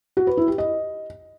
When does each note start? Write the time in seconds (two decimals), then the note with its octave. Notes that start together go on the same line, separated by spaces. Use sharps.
0.17 F#4
0.27 B4
0.37 E4
0.48 G4
0.58 D#5